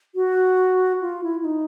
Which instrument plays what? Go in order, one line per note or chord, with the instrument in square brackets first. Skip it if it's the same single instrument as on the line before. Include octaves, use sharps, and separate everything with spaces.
[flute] F#4
F4
E4
E4
D#4